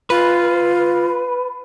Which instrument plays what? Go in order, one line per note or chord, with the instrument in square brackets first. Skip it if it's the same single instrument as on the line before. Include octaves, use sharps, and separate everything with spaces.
[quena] F4 [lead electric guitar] B4